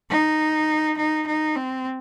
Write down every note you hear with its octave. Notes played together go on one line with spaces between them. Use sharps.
D#4
D#4
D#4
C4